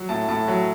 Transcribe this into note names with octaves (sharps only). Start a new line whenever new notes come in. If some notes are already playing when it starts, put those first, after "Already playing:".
Already playing: F#3
A2 A5
A2 A5
F#3